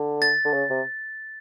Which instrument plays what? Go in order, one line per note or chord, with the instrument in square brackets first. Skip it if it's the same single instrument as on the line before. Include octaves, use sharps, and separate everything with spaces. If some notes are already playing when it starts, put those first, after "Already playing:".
Already playing: [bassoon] D3
[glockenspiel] A6
[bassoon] D3
C#3
C3